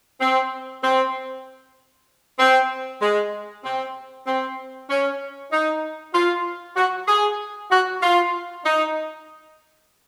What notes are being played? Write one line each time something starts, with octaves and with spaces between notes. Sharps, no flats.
C4
C4
C4
G#3
C4
C4
C#4
D#4
F4
F#4
G#4
F#4
F4
D#4